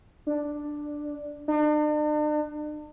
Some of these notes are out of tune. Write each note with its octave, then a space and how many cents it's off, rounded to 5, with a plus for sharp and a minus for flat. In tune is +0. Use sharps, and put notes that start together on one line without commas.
D4 +5
D4 +45